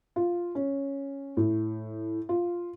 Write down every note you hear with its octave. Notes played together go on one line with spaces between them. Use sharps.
F4
C#4
A2
F4